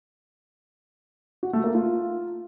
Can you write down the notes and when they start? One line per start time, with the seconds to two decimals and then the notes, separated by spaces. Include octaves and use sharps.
1.43 F#4
1.53 A3
1.64 A#3
1.74 F4